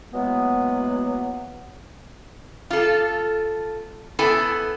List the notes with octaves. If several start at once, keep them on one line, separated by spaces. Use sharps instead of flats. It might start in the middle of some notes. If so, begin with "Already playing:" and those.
E3 F#3 G#3 A#3 B3
F4 A4
B3 E4 A4 G#5